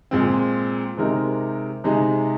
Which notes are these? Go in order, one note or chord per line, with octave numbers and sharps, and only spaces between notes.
A#2 G#3 C4
C3 G#3 C4 D#4 A#4
C3 G#3 D#4 G#4